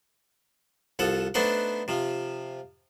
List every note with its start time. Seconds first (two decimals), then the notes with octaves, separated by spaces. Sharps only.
0.99 C2 F3 A4 F#5
1.34 A3 B3 D4 D#4 C5 F#5
1.88 C3 F3